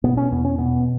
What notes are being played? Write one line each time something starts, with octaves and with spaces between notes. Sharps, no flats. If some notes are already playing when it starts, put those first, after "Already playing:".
B2 B3
C#4
E2 B3
C#4
B2 B3